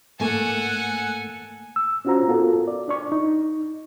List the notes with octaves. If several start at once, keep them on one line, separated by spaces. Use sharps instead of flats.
G#2 A3 A#3 A4 F#5 G#5
E6
C#4 D4 F4 F#4 C5 A#5
B3 F4 F#4 A4 A#4
D5
D4 D5 C#6
D#4